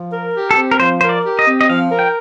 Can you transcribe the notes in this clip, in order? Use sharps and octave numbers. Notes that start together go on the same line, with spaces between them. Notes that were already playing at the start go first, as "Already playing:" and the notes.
Already playing: F3
A#4
G4
A4
C4
A#4
F3 C5
A#4 C5
D5
G4
D#5
C4
D#5
F3 F5
A#4
G5